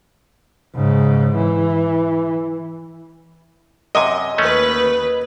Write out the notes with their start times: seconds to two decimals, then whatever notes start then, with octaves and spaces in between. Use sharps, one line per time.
0.75 G#2 C#3
1.35 E3
3.95 F#2 C3 D#5 G#5
4.38 D#2 A3 C#4 B4